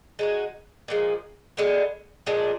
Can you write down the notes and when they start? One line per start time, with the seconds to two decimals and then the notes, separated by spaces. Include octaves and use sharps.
0.19 G#3 D#4 F#4
0.88 A#2 F3 G#3
1.57 D3 G#3 B3
2.26 A#2 F3 G#3 D4